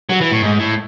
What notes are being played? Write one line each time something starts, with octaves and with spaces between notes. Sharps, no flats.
F#3
E3
A2
G#2
A2